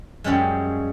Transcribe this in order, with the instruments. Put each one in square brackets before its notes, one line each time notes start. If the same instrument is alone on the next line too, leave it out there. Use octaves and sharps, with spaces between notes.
[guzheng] F#2 C#3 G3 G#3